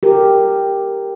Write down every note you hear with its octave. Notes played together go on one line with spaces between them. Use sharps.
G4 A#4